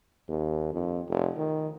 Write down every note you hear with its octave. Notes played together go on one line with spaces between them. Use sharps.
D#2
F2
F1
D#3